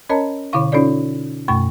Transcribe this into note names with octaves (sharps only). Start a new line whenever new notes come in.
C#4 A#4 C#5 D#5 A5 A#5
B2 D3 E4 C#5 F5 C#6
C#4 D#4 F4 A4 C#5 D5
F#2 B2 A3 C#6